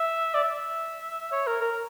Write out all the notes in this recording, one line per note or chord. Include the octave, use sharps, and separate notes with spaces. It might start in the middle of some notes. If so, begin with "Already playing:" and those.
Already playing: E5
D5
E5
C#5
A#4
A#4